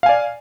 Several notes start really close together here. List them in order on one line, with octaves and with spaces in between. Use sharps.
F5 G#5 D5